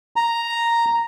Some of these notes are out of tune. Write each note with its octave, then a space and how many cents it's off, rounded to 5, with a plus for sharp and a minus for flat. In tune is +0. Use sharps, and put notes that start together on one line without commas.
A#5 +0